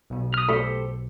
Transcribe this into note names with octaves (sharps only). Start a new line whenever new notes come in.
B1 B2
D#6 F6
A2 G4 A4 C5